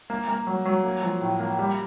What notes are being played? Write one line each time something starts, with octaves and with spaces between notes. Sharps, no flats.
A#3
A#3
F#3
F#3
A#3
F3
A2
A#3
G3